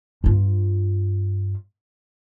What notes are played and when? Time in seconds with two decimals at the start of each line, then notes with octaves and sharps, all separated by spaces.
0.24 G2 F4